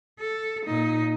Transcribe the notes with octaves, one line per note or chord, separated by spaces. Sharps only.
A4
A#2 D#4